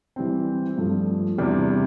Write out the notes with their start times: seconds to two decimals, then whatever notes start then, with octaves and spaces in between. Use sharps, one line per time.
0.16 E3 G3 C4
0.78 G2 F3 A3
1.38 E2 C3 G3 D4